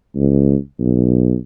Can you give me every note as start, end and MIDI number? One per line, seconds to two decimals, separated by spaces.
0.15 0.56 37
0.80 1.36 35